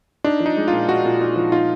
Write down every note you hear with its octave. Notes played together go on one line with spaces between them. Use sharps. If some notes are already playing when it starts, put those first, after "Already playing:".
D4 D#4
F3
D#4
G#3
A#2 F4
A#2 F#4
A#2
D#4
F3
D#4 F4